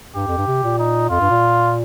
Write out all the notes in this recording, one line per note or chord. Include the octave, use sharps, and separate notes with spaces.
G2 G4
F2
G2
C3
A#2
D#4
F2 F4
G2
A#2